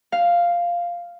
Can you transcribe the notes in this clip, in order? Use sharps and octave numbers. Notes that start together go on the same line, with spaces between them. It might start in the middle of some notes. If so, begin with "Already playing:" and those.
F5